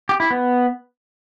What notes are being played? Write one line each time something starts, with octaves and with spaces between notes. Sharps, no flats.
G4
E4
B3